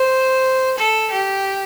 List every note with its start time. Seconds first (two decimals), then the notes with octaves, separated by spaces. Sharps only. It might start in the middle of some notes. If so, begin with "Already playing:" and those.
Already playing: C5
0.78 A4
1.11 G4